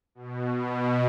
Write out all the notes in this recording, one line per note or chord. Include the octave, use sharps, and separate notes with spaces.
B2
B2